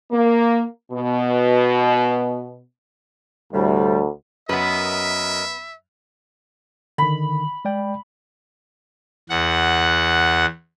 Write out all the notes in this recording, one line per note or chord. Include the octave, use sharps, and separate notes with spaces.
A#3
B2
D2 A2 C3 G3
F#2 B3 A#4 B4 D#5 E5
D3 D#3 B5
G#3 D5 G5
E2 F#5